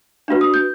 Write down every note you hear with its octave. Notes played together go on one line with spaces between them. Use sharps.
D4 F#4 B4
D#6
G6